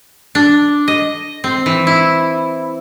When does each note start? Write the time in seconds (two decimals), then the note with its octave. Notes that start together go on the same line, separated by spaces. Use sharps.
0.35 D4
0.88 D#5
1.44 C4
1.66 E3
1.87 E4